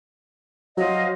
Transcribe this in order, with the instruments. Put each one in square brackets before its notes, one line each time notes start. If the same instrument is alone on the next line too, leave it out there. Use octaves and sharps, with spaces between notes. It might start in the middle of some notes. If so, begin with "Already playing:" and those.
[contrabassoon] F#3 [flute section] C5 D#5 F5